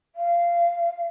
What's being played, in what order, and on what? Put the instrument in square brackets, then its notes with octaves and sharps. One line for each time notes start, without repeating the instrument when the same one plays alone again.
[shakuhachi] F5